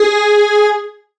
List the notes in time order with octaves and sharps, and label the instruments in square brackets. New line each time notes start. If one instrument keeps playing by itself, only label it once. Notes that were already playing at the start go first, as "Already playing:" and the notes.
Already playing: [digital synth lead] G#4